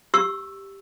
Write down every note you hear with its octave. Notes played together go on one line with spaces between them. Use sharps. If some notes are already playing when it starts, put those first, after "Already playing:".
G4 C#6 E6